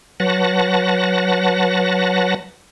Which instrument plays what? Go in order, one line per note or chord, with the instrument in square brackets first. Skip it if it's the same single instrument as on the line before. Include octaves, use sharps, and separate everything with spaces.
[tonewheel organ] F#3 B4 F#5 A5 A#6